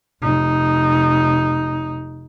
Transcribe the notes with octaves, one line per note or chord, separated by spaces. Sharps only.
F1 D#4